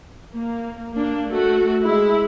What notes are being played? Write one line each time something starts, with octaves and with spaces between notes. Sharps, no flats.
A#3
A#3 D4
A3 F#4
G#3 E4